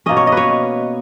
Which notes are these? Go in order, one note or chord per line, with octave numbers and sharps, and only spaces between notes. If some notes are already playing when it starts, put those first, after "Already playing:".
B2 A#3 C#4 D#5
C#5
D#5
B4
C#5